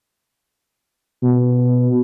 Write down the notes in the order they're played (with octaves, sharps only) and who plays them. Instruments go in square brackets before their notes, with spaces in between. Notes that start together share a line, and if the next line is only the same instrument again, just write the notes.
[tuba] B2